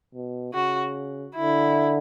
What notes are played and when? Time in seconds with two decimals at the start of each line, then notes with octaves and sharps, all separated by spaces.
0.15 B2
0.54 C#3 F#4
1.35 D3 E4